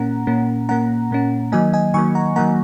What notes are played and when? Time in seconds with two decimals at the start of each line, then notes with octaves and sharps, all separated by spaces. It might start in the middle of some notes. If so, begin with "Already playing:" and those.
Already playing: A#2 A#3 C#4 F#5 A#5
0.27 A#2 A#3 C#4
0.69 A#2 A#3 C#4 F#5 A#5
1.11 A#2 A#3 C#4
1.52 D#3 F#3 A#3 D#5 G#5
1.73 D#5 G#5
1.94 D#3 F#3 A#3 G#5 C#6
2.15 F#5 A#5
2.36 D#3 F#3 A#3 F#5 A#5